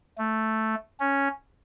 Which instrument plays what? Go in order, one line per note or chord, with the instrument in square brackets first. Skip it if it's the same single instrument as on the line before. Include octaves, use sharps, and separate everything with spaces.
[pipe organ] A3
C#4